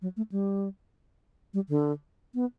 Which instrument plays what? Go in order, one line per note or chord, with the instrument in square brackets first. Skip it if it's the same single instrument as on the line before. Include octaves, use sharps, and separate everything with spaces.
[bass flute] F#3
A3
G3
G3
D3
B3